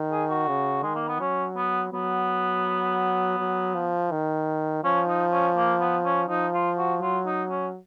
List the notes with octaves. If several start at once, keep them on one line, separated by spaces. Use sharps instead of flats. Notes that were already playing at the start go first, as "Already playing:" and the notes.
Already playing: D#3
G#4
F#4
C#3
D#3 G#3
A#3
B3
F#3 C#4
B3
F#3 B3
F#3
F3
D#3
F3 C#4
D#4
C#4
A#3
B3
C#4
F3 D#4
F4
F#4
F#3 F4
D#4
C#4